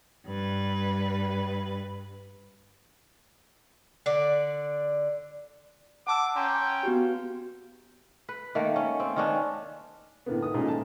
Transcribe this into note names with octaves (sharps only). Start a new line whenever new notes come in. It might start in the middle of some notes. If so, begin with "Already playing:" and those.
G2 B4
D3 D5
F#5 A5 D6 E6
C#4 G5 G#5 A#5 C6
B3 F#4 G4
B4
D#3 A3 A#3
C#4
C4
D#3 C#4 D4
A2 D3 A#3 B3
G#2 D#6
A#2 D#3 G#3 A3 C#4
A5